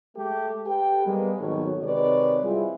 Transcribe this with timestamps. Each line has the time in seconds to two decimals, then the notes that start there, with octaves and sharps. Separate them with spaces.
0.16 G#3 A3 G4 A4
0.67 G4 A4 B4 G5
1.05 G3 G#3 A#3 B3
1.38 G#1 B2 D#3 F#3 A4 C#5
1.82 C3 D#3 G#3 B4 C#5 D5
2.43 G3 G#3 C4 E4 F4 G#4